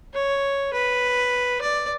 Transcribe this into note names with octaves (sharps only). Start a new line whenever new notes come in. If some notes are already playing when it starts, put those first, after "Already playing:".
C#5
B4
D5